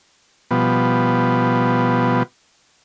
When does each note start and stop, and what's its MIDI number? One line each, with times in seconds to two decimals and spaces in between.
0.51 2.23 47
0.51 2.23 53
0.51 2.23 55
0.51 2.23 59